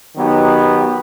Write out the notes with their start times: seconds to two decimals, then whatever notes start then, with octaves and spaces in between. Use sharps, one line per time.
0.16 D#3 F#3 B3 D#4 G4